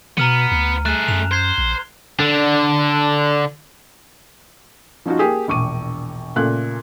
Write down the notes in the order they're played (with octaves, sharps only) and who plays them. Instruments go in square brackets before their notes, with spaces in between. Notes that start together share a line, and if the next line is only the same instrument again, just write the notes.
[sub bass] B2 [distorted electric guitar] B3 [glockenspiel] A#5 F6 D#7
[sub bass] D2
[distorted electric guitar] A3 G#4 [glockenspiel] F#6 E7
[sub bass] F#2 [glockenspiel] F7
[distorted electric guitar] C5 [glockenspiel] G6 G#6 C7
[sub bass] A#1
[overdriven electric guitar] D3 D4
[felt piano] F3 C#4 D#4 F4 F#4
A#3 G4 G#4
E1 A#1 C#6 D6 D#7
A#2 C#3 A3 F#6